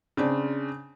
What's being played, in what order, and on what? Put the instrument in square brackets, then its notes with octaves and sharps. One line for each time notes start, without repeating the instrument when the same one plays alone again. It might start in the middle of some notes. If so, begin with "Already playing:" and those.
[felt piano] C#3 C4 D4